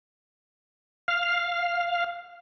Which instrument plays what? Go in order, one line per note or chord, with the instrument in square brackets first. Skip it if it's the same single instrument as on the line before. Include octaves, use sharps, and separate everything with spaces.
[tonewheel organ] F5